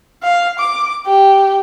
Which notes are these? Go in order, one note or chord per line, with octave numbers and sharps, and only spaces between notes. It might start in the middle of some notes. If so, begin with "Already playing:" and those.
F5
D6
G4